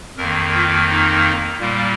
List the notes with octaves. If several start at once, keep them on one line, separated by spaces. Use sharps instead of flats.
F2 D#3 A#3 A#4
F4
D#4
A#2 G3 A#3